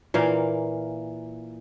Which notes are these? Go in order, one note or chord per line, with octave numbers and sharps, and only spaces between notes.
A#2 E3 A#3 F5